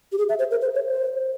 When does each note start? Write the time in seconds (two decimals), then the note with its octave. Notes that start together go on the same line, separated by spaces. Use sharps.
0.12 G4
0.18 G#4
0.29 E5
0.39 C5
0.51 A#4
0.61 C5
0.75 C#5
0.89 C5